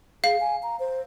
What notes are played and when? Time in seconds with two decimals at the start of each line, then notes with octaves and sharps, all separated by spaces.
0.24 G#4 F5
0.41 G#5
0.63 A#5
0.79 C5